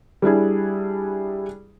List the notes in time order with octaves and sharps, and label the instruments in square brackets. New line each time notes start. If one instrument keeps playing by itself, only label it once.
[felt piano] G3 D4 E4 G#4